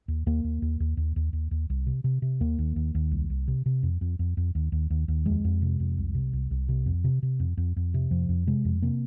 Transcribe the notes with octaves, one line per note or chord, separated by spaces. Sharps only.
D#2
D#2 A#3
D#2
D#2
D#2
D#2
D#2
D#2
D#2
C2
C3
C3
C3
D#2 A#3
D#2
D#2
D#2
C2
C2
C3
C3
F2
F2
F2
F2
D#2
D#2
D#2
D#2
F2 G#3
F2
C3
F2
C2
C3
C2
C2
C3
F2
C3
C3
F2
F2
F2
C3
F2 F3
F2
C3 G#3
F2
C3 A#3